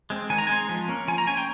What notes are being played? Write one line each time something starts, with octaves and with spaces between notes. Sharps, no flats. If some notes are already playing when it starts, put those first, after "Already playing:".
G#3 C4
D#3 G#5
A#5
G#3 C4 G#5
F3
A#3 C#4
F3 G#5
A#5
A#3 C#4 G#5
G5